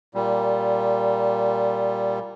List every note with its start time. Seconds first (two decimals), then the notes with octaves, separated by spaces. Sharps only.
0.15 A#2 G3